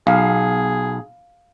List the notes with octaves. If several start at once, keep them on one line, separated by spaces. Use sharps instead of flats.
B1 G#4 F5